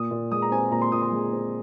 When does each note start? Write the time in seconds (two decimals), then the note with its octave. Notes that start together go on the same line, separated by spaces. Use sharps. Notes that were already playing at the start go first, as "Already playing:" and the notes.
Already playing: A#2 D#6
0.11 A#2
0.32 G#3 D#6
0.42 A#5
0.51 C4 G#5
0.71 A#2 A#5
0.82 C6
0.92 A#2 D#6
1.02 C6
1.12 G#3
1.32 C4